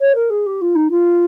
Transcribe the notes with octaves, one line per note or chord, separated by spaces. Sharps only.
C#5
A#4
G#4
G4
F4
D#4
F4